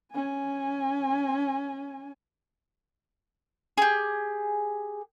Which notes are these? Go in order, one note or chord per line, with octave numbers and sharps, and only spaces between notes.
C#4 G#5
G4 G#4